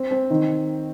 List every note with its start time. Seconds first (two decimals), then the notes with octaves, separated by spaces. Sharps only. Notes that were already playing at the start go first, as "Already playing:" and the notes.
Already playing: C4
0.11 C4
0.30 D#3